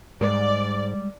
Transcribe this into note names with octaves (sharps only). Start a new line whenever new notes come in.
G#2 G3 G#3 G4 D5